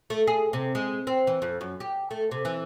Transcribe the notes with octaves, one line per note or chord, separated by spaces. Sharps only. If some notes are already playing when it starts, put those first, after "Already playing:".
A3
G#4
C3
G#3
C4
E3
F2
F#2
G4
A3
C3
E3